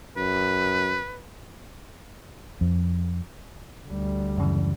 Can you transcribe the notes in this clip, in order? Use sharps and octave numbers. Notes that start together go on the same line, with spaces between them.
F#2 B4
F2
D2 G3
F#2 C#3 E3